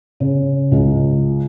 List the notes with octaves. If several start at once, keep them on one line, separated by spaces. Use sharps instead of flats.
C#3
C#2